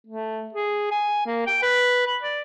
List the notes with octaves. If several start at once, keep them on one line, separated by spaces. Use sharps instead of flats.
A3
G#4
G#5
A#3
G5
B4
B5
D5